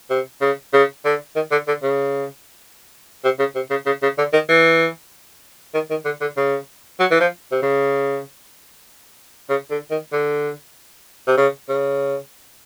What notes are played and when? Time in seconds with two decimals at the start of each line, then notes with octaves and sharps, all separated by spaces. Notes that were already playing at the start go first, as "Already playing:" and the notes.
0.10 C3
0.41 C#3
0.73 C#3
1.05 D3
1.36 D#3
1.51 D3
1.68 D3
1.83 C#3
3.24 C3
3.39 C#3
3.55 C3
3.70 C#3
3.86 C#3
4.03 C#3
4.18 D3
4.33 D#3
4.49 E3
5.74 D#3
5.90 D#3
6.05 D3
6.21 D3
6.37 C#3
7.00 F#3
7.11 E3
7.20 F3
7.52 C3
7.62 C#3
9.50 C#3
9.71 D3
9.91 D#3
10.12 D3
11.28 C3
11.37 C#3
11.69 C#3